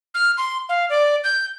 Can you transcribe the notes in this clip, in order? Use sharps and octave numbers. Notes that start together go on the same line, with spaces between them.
F6
C6
F5
D5
G6